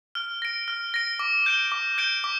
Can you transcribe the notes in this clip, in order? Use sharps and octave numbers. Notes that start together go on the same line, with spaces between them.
F6
A#6 D7
F6
A#6 D7
D6
G6 D7 G7
D6
G6 D7 G7
D6